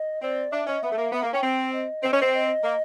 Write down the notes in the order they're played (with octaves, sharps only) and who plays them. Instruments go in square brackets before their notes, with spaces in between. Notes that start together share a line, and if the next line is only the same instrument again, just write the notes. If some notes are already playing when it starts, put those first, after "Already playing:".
Already playing: [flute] D#5
[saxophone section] C4 [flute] D5
[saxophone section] D4 [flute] E5
[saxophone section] C#4 [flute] D#5
[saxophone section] B3 [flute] E5
[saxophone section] A3
A#3
[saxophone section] B3 [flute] E5
[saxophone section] A#3
[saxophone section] C#4 [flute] G5
[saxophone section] C4
[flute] D#5
[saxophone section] C4
C#4
C4
[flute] D#5
[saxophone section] A#3